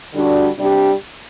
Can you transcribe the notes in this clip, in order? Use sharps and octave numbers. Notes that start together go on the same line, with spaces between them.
D3 G3 D4 F#4
C3 G3 D4 G4